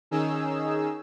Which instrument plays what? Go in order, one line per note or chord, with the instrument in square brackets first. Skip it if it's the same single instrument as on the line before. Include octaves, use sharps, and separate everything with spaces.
[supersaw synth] D#3 C#4 D#4 G#4 E6